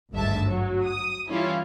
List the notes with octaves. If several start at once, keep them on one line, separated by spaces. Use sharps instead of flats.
G#1 D2 G2 G#3 E5 A5
F#3
D#6
E3 G3 C#4 E4 F4